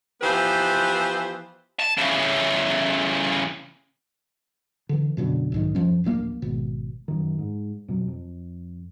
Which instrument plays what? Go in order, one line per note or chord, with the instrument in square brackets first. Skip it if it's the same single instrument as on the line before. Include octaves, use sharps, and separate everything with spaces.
[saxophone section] E3 F3 B3 G4 B4 C5
[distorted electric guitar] A5
C#3 E3
[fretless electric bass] D3 E3
F#2 B2 D3
B1 G#2 D#3
F#2 F3 C#4
D1 A#1 C3 A#3
G#1 B2
[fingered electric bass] F#2 D#3
G#2
F2 B2 F#3
F2